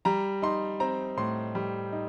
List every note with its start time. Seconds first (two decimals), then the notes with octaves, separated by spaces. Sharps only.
0.05 G3 A#5
0.42 D#4 C6
0.80 C4 A#5
1.17 A2 C6
1.55 G3
1.92 D#4